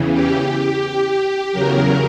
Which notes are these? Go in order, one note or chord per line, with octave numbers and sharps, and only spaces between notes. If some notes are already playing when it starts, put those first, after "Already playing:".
Already playing: E2 C#3 E3
G4
G4
E2 C#3 F#3 A#4